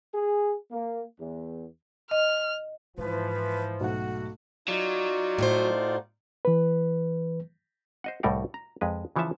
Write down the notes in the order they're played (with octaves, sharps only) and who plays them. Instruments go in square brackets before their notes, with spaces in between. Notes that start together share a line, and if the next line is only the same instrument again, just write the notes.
[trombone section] G#4
A#3
E2
[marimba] D#5 [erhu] F6
[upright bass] G#2 [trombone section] E3 F3 [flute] B4
[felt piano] B1 A3 F#5 [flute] F#4
[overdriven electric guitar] F#3 [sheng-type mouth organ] D#4 F4 D5
[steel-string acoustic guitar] A2 F#4 C5
[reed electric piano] E3 B4
[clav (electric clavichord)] C5 D#5 F#5
C2 A2 G3 A3 A#4 F#5
A#5
F2 G#3 B4
C#3 E3 F3 C#5 E5 A5